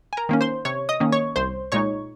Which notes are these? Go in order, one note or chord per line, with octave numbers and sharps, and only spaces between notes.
G#5
A#4 A#5
D#3 A#3 C#4
C5 C6
C3 C#5 C#6
D#5 D#6
D#3 A#3 C#4
C#5 C#6
C2 C5 C6
A#2 G#3 D#4 C#5 C#6